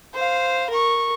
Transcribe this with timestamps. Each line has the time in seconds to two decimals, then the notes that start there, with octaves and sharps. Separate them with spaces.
0.14 C5 F5
0.70 A#4 C#6